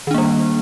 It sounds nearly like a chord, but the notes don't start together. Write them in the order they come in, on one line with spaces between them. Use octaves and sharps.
D#3 D4 A#3 G3